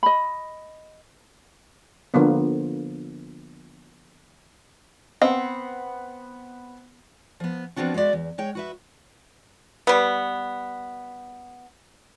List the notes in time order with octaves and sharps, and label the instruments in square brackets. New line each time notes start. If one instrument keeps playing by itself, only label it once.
[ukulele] D#5 B5
[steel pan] D3 F3 A#3 B3
[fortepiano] B3 F#5 [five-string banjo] C4 [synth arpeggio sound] D#5 F5
[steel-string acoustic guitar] F3 B3
F3 G3 B3 C4 D4 F#4
G#3 B3 F#4 D5 E5
E2
G#3 C#5 G5
F#4 B4 E5
[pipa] G3 B3